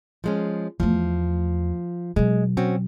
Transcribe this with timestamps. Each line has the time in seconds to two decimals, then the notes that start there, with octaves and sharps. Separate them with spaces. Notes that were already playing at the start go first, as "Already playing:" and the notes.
0.24 F3 G#3 C#4
0.80 E2 F3 A3
2.16 B2 F#3 G#3
2.57 C4 C#4 F#4